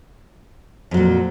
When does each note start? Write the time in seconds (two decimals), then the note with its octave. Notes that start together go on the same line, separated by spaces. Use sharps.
0.91 F2
0.94 F#3
0.97 A#2